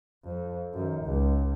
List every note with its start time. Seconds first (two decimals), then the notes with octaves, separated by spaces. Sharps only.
0.25 F2
0.74 F#2 D#3
1.05 C#2